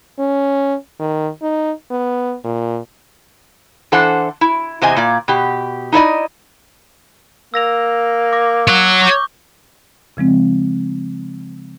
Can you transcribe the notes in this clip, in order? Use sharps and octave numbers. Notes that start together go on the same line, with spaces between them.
C#4
D#3
D#4
B3
A#2
E3 D4 A4 C5 F#5
E4
E2 C3 C5 D#5 G#5
A#2 A#3 D5
B2 G4
D#4 E4 D5 D#5
A#3 E6 A#6 F7
D6 A#6
C#5 F#5
C#6 D6 G6
C#3 F3 G#3 C4